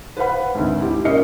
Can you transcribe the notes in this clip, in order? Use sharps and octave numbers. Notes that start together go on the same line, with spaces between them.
B4 C5 F5 F#5 B5
G#1 D2
E4 G4
A#2 C#4 A#4 D#5 C7 C#7